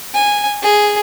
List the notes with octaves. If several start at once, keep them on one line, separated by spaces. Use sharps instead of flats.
G#5
G#4